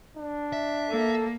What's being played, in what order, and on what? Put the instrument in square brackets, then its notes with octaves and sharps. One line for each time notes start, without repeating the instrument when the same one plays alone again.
[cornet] D4
[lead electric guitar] E5
[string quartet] A#3 [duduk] A4